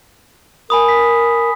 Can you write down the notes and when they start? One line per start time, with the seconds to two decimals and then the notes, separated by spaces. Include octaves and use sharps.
0.70 A#4 G#5 B5 D#6
0.89 B6